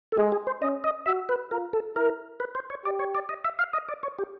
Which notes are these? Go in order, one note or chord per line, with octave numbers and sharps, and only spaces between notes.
A4
G#3 G#4
G#4
C5
C#4 D#5
D#5
F#4 E5
B4
F4 A#4
A4
E4 A#4
B4
C5
C#5
G4 D5
C#5
D5
D#5
E5
F5
D#5
D5
C#5
G4